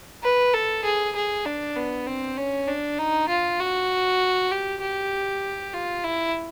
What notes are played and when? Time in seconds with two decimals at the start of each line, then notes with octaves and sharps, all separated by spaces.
0.23 B4
0.54 A4
0.84 G#4
1.15 G#4
1.45 D4
1.76 B3
2.07 C4
2.37 C#4
2.68 D4
2.99 D#4
3.29 F4
3.60 F#4
4.51 G4
4.81 G4
5.73 F4
6.04 E4